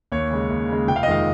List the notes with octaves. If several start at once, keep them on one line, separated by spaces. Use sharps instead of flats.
D#2 C#5
C#3 G#3
D#2
C#3 G#3
F1 G5
F5
D#5
F2 D#3 G#3 F5